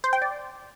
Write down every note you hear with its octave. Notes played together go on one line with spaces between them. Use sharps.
C5
G5
D5